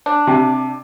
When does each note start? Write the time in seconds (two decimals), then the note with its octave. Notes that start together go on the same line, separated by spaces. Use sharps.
0.06 D4
0.27 C3